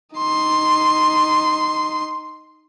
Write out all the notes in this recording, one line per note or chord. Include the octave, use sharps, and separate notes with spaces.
D#4 C6